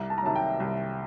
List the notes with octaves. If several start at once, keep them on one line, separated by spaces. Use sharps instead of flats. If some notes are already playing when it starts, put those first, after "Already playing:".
Already playing: C2 A#5
A5
A#5
C3 D#3 F#3 A5
G5
C2